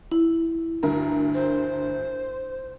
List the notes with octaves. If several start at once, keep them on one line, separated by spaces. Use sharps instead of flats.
E4
D2 G2 A#4
C5